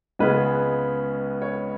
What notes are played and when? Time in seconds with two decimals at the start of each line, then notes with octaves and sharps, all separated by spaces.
0.19 C#2 C#3 G#3 B3 B4
1.42 C#5